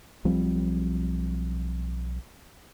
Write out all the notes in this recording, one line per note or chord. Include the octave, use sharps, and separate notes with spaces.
B1 F3 G3 C4